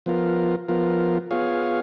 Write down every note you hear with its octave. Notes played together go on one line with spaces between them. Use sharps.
F3 B3 F4 A#4
F3 B3 F4 A#4
B3 F4 G#4 C#5 F5